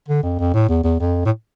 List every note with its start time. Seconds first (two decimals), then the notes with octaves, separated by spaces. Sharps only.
0.08 D3
0.23 F2
0.39 F2
0.54 A2
0.69 E2
0.84 E2
1.00 F2
1.25 A2